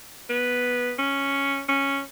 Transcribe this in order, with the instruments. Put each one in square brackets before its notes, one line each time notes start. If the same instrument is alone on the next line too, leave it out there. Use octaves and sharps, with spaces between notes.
[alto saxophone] B3
C#4
C#4